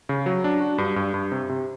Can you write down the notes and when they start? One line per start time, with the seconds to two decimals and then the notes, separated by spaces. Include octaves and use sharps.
0.09 C#3
0.26 F#3
0.44 D4
0.61 F#4
0.78 G2
0.96 G2
1.14 G2
1.32 C3
1.49 C3